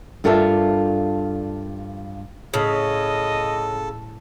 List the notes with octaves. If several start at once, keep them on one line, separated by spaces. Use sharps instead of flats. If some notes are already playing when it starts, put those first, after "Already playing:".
G2 F4 A4 A#4 D5 E5
A2 C#3 A4 D#5